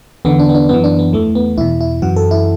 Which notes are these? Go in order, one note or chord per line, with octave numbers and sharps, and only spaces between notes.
E2 D3 B3
D4
B3
D4
F#2 E3 B3
D4
B3
E2 E3 A3
B3
E2 B2 E4
E4
F#2 E3 F#4
A4
E4